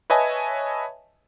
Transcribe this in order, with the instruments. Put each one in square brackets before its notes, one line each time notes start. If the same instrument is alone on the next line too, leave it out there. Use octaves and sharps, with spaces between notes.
[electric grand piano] B4 C#5 D#5 E5 G#5 A5